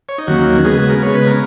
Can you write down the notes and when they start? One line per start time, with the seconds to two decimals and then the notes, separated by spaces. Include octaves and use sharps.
0.09 C#5
0.18 D#4
0.27 D#2 D#3 F#3 A#3 C#4 F#4
0.65 C#3 G#3 B3 G#4
0.78 F#4
0.89 A#4
1.02 C#3 G#3 B3 C#5
1.15 B4
1.27 A#4